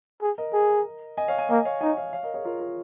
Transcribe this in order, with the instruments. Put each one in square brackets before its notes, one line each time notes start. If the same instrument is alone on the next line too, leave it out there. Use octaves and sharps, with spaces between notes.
[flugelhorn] G#4
[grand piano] A#4 D#5
[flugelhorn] G#4
[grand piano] D#5 G#5
C#5 F5
D#5 G#5
[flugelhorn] A#3 [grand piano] D#5 G#5
[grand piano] C#5 F5
[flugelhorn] D#4 [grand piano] D#5 G#5
[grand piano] C#5 F5
C#5 F5
A#4 D#5
G#4 C#5
F4 A#4
F4 A#4